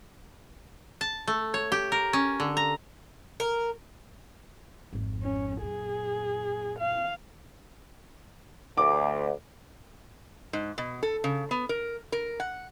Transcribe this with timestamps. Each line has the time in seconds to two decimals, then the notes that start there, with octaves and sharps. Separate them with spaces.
1.01 A5
1.27 A3
1.54 C#5
1.72 G4
1.92 A#4
2.13 C#4
2.40 D3
2.57 A#5
3.40 A#4
4.93 G#1 F2
5.23 C#4
5.62 F#2 A#2 G#4
6.79 F5
8.77 D2 D6
10.53 G#2
10.78 B2
11.03 A4
11.24 C#3
11.51 B3
11.69 A#4
12.12 A#4
12.40 F#5